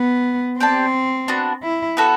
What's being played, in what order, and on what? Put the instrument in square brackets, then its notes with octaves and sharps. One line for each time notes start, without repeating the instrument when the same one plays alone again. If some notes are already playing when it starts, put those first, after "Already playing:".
Already playing: [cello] B3
[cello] C4 [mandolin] G4 D5 A5
[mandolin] B3 D4 F#4
[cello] E4
[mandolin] B3 F#4 A4